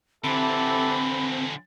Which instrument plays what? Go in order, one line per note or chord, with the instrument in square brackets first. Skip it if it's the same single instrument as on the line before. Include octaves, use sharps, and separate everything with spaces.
[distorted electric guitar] D3 E3 [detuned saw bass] C4 [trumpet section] E4 G4 A4 [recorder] B5